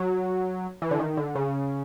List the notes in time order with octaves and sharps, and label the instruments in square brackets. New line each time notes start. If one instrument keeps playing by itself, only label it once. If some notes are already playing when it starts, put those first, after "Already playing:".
Already playing: [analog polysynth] F#3
E3
D3
D#3
D3
C#3